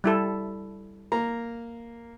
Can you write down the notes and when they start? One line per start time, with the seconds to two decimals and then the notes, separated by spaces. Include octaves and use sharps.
0.04 G3 E4 A4
1.12 A#3 A#5